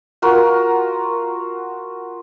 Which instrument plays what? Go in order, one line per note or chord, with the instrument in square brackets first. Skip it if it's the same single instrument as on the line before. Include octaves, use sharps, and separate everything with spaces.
[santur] F4 F#4 A#4